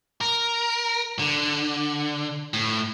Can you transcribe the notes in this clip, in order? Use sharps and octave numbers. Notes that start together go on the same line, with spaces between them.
A#4
D3
A2